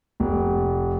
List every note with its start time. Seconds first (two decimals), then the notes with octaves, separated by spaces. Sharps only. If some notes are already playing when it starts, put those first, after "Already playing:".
0.20 F1